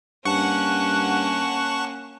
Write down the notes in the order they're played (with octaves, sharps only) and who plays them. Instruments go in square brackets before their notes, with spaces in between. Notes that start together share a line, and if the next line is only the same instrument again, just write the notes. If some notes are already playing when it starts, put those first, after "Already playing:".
[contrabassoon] G2 [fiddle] A#3 C#4 [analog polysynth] F#5 [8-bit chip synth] A5 C#6